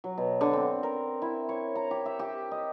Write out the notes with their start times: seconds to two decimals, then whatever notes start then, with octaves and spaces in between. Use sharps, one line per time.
0.04 F#3
0.18 B2
0.41 D3
0.53 C4
0.83 A#4
1.22 E4
1.49 C#5
1.75 A#5
1.91 G4
2.06 E5
2.19 G4
2.51 D#5